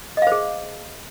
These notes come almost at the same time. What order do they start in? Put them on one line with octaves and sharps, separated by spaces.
D#5 F5 C5 G#4